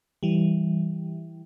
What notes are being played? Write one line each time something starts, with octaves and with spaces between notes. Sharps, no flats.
E3 G3